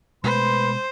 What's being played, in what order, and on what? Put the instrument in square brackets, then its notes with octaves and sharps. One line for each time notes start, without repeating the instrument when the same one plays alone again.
[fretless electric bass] B2 G#3 A3 [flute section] B4 B5 C6 [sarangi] C5